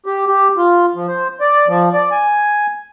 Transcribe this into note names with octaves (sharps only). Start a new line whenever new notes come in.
G4
G4
F4
F3
C5
D5
F3
D5
G#5